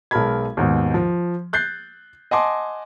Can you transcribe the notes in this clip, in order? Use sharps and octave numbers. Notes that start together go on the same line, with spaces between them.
B1 G#3 A#4 A5 B5 G#6
D#2 G#2 B2
F3
F#6 G6 A6 C7
D#5 F#5 G#5 A5 C6 D6